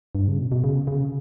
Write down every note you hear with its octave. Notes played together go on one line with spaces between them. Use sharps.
G2
C#3
B2
B2
C#3
C#3